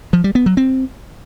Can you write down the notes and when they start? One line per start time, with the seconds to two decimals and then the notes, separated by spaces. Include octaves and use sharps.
0.13 F3
0.24 G3
0.35 B3
0.46 F#3
0.57 C4